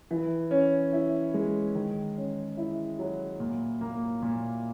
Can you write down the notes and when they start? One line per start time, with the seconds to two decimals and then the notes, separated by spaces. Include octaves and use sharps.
0.11 E3
0.51 C#4
0.93 E4
1.34 G#3
1.75 D#3
2.17 C#4
2.57 E4
2.99 F#3
3.40 A#2
3.81 A#3
4.22 A#2